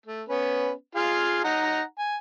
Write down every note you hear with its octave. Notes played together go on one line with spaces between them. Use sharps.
A3
B3 C#4 B4
F4 G#4 F5
D#4 F#5 A#5
G#5